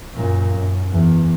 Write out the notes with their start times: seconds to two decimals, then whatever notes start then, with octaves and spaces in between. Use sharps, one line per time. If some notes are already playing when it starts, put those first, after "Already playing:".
0.15 F#2 A#2
0.55 F#2
0.91 E2